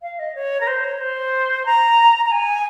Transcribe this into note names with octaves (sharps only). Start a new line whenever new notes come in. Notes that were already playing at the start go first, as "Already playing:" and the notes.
F5
D#5
C#5
A#4
C5
C#5
C5
A#5
A#5
G#5